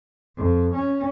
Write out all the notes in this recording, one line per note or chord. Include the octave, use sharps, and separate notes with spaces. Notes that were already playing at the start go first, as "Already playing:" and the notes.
F2
C#4